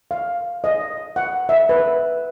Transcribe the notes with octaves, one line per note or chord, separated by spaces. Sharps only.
F5
D#5
F#5
E5
B4